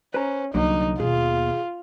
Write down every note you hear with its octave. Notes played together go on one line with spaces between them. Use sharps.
C#4 B4 C5 A#5
C2 D3 F#3 A#3 D#4
D#2 B2 F4 G#4